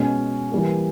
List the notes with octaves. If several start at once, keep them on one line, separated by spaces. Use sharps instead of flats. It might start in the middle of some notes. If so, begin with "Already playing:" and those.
Already playing: B2 G#3 C#4
E3 G3 A#3